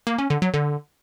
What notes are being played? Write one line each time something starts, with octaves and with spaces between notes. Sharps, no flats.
A#3
C#4
D3
F#3
D3